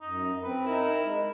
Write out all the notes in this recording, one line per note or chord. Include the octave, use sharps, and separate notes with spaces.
F#2 D#4
C4 B4
D#4 E4 A#4
G#3